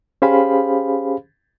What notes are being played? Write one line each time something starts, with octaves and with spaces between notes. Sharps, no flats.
C#4 G4 G#4 C5 F5 B5